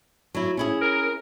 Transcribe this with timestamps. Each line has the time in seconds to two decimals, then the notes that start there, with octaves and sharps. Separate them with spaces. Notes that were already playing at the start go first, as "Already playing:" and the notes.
0.34 F#3 E4
0.57 C#4 E4 G#4
0.82 A#4